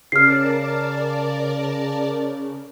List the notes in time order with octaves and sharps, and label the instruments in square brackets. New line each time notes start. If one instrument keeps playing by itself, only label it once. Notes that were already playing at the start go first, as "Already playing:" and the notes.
[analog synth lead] C#3 [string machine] A#4 D5 A5 [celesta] F6 C7